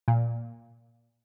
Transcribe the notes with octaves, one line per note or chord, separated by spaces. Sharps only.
A#2